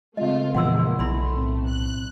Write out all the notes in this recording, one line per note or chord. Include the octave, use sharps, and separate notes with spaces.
C#3 G#3 A3 C4 F4 D#5
A#1 E2 A#2 E3 F3 F#5 C6 E6
B1 A3 E4 B5 C6
A2 C4
F#6